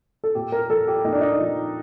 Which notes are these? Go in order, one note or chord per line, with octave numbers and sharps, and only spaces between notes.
A4
A#2 G4
A#4
F3 A4
G4
A#2 D#4
D4
D#4
F3